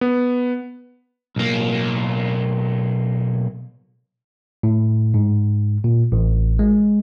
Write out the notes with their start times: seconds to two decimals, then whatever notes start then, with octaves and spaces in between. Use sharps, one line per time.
0.01 B3
1.36 B1 A#3
4.63 A2
5.14 G#2
5.84 A#2
6.12 A1
6.59 G#3